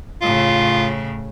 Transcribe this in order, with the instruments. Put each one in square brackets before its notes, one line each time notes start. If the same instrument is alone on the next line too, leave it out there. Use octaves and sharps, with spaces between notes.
[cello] A2 C#3 [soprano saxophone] F4